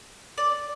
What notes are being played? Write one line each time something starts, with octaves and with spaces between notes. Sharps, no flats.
D5